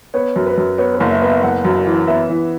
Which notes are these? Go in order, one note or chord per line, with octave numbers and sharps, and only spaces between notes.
B3 C#5
F#2
B4
F#2
B3 C#5
B4
F#1
E5
B3
E5
F#1 F#5
F#2
E3
B3 E5
E3